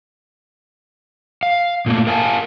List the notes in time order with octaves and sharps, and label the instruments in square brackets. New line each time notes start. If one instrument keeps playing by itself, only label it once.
[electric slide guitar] F5
A#2 A3 A#3
A#4 F5 G#5 A5